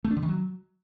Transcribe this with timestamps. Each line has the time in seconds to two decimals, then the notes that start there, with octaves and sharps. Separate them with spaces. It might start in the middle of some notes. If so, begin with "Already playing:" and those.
0.04 A3
0.10 D4
0.17 D3
0.23 D#3
0.29 F#3